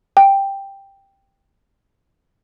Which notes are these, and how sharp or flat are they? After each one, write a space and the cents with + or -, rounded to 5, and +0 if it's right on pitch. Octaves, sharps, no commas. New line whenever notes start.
G5 +5